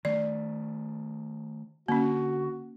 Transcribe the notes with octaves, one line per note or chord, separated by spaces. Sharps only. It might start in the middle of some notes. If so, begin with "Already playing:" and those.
D#3 A3 D5
D3 A#3 C#4 F#4